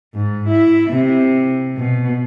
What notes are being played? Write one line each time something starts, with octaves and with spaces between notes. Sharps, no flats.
G#2
E4
C3
B2